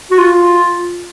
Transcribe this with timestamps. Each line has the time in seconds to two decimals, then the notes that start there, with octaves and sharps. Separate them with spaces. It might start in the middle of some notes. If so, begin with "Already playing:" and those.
0.11 F#4
0.18 F4